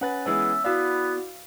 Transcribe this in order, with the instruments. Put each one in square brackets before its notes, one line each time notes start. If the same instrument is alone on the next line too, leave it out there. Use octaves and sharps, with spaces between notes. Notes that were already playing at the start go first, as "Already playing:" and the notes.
[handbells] C#4 A6 [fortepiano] B4 F#5
[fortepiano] E3 G#3 B3 [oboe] E5
[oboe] B3 [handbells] E4 F#4 D5 [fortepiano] F5 E6